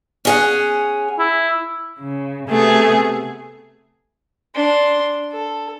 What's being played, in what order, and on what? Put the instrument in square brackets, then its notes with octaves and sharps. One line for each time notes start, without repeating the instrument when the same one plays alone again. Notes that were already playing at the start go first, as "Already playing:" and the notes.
[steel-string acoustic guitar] C#4 G#4 F#5
[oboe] E4
[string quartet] C#3
C3 A3 B3 G#4
[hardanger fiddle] D4 C6
A4